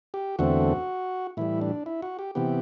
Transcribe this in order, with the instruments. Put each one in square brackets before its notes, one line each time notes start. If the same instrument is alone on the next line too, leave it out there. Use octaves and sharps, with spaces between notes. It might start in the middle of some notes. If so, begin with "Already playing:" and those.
[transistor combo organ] G4
E2 D3 A3 C4 F#4
A2 E3 G3 E4
D4
E4
F#4
G4
C3 E3 B3 G4